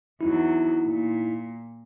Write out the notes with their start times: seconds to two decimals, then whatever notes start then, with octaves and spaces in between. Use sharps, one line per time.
0.21 E2 F#3 D#4 E4
0.87 A#2